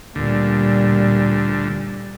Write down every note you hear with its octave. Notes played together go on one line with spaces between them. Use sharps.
D2 A#2 G3